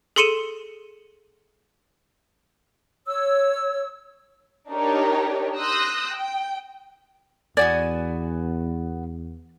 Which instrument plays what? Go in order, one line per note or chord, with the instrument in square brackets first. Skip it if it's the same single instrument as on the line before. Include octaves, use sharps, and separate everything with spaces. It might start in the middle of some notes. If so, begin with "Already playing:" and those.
[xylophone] G#4 A4 C6 C#7 D#7 E7
[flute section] C#5 E6
[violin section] D4 D#4 G4 A#4 C#5
C6 D#6 E6 F#6 G6 A#6
G5
[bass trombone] E2 [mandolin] B3 F#4 G#5 [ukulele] D5